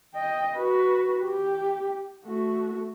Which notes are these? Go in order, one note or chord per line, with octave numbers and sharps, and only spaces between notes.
D#5 G5
F#4 B4
G4
A3 F#4